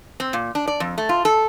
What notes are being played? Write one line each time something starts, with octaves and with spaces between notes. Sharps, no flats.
C4
A#2
D4
D5
F2
A3
F4
A4